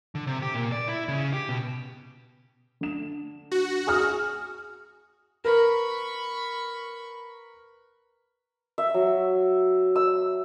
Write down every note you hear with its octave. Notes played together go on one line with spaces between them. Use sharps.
D3
C3
G4
A#2
D5
E4
C#3
G4
B2
D3 E7
F#4
G#4 D#6 F6
A#4 B4 B5 C#6
E5
F#3
E6